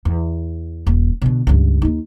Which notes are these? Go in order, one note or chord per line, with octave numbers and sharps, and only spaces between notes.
E2
D#1
B2 D3
C#2 G2
D#2 D#4